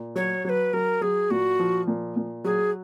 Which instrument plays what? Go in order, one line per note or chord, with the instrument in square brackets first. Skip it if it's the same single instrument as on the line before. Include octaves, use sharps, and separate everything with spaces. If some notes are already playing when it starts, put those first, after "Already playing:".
Already playing: [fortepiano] A#2
[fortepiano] F#3 [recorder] C#5
[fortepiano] F#3 [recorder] B4 C#5
[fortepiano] F#3 [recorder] A#4
[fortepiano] F#3 [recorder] G#4
[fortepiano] A#2 [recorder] F#4
[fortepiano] F3
A#2
A#2
[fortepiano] F#3 [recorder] G#4